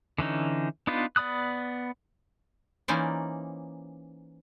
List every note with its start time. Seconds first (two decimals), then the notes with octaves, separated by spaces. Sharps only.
0.18 D3 E3 C#4 D#4
0.87 B3 D4 D#4 F4 B4
1.16 B3 D5 B5 D#6 F#6
2.88 E3 A#3 C#4 D#4 C5 D5